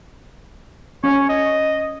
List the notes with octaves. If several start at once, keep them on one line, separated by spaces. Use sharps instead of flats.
C#4 C#5
D#5